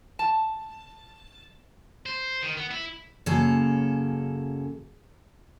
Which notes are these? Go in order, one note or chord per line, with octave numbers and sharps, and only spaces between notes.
A5
C5
D#3
B3
E4
F#2 C#3 A#3 A4